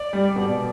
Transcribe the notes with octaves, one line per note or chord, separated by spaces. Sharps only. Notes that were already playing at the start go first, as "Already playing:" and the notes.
Already playing: D5
G3
B2